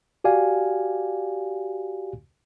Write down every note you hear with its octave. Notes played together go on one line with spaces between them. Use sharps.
F#4 G4 D5 F5 G#5